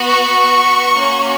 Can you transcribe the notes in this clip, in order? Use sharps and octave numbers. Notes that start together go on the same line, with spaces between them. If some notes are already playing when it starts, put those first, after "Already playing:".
Already playing: B3 F#4
C#6
A#3 C#4 F#4